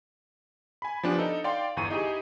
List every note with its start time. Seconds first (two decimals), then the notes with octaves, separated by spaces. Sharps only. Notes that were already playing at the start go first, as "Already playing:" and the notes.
0.82 G#5 B5
1.03 F3 B3 D4 G4
1.19 D#4 A4
1.44 D5 F5 G5 C6
1.76 G1 E2 C#6 D#7
1.90 D#4 E4 G4 G#4